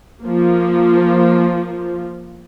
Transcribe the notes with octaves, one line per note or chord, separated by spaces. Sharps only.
F3 A#3